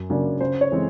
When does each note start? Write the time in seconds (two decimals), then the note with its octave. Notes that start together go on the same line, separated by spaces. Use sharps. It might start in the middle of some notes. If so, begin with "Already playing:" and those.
Already playing: F#2
0.09 C#3 F#3 A#3 D4
0.41 C#3 C5
0.61 C#5
0.72 E3 G#3 C4